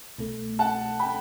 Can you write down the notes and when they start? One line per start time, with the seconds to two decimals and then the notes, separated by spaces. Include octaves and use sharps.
0.18 C2 B2 A3
0.59 F#5 A5
1.00 G5 B5